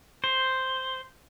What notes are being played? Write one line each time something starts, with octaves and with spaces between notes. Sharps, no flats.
C5